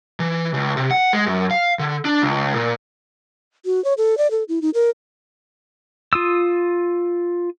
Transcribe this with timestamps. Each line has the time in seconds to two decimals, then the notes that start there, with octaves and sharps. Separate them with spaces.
0.20 E3
0.54 C#2
0.77 C3
0.91 F#5
1.13 G#3
1.27 F#2
1.51 F5
1.79 D3
2.05 D4
2.22 C#2
2.55 A#2
3.65 F#4
3.85 C#5
3.98 A4
4.18 D5
4.31 A4
4.49 E4
4.62 D#4
4.74 A#4
6.13 F4 D#6 E6